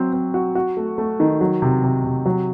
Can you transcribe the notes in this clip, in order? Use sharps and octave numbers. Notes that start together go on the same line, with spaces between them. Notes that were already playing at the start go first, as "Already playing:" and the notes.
Already playing: F#3 C4
C4
F#4
F#4
A3
A3
D#3
F#3
C3
C3
C3
F#3